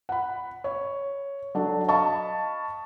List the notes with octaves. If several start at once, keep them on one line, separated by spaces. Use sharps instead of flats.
F#5 B5
C#5
F#3 D4 A4
D#5 F5 A5 B5 C#6